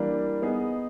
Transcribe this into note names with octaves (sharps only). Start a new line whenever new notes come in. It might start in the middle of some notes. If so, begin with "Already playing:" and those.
Already playing: E3 G3 A#3 D4
B3 D#4 G#4